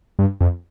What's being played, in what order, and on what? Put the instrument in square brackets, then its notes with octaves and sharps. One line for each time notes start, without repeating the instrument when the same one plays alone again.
[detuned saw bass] G2
F2